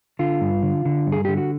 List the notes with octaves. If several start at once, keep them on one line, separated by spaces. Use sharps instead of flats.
D3 F4
G2
D3
D3
G2
G#4
D3 G4
F#4